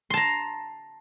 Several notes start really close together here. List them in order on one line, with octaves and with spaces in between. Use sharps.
C6 A5 A#5